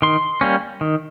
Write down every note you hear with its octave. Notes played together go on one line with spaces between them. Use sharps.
D#3 C6
G3 A#3 C#4
D#3